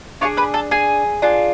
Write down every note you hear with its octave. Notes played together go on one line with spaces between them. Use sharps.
D4 F4 G#4 C#5 C#6
B4 B5
A4 A5
G#4 G#5
D4 F4 G#4